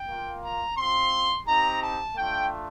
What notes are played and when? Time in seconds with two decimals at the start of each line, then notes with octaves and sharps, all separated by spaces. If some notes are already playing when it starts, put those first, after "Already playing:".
Already playing: G5
0.09 A#3 F4
0.44 A#5
0.77 C4 F4 C6
1.46 C4 D#4 G4 A#5
1.81 A5
2.15 A3 D4 F4 G5